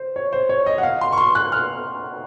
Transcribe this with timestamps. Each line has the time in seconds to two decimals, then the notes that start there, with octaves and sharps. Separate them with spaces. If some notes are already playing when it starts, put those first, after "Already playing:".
Already playing: C5
0.16 C#5
0.33 C5
0.49 C#5
0.66 D#5
0.78 F#5
0.83 F5
1.01 C6
1.12 C#6
1.18 C6
1.35 F#6
1.52 F6